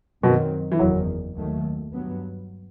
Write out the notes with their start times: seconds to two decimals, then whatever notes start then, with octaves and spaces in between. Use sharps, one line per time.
0.23 F#2 B2 D#3 F#3 C4
0.72 E3
0.79 F#1 E2 D#3 F#3
1.36 D#2 D#3 F#3 A3
1.93 G2 F#3 B3